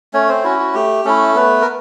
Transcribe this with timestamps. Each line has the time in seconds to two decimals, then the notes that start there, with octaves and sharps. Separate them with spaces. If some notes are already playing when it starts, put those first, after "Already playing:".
0.13 A3 C#4 C#5
0.28 C4 C5
0.44 C#4 E4 F#4
0.59 F#4
0.74 A3 G4
1.05 A3 C#4 E4 A4
1.35 A3 B3 B4
1.62 A#4